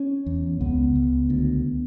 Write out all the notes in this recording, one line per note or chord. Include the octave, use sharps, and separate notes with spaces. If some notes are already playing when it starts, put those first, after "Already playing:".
Already playing: C#4
E2
C#2 B3
C#2
D2